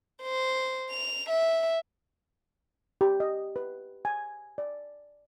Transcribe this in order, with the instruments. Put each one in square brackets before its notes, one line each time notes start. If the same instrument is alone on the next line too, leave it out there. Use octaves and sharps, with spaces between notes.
[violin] C5
F7
E5
[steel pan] G4
D#5
B4
G#5
D5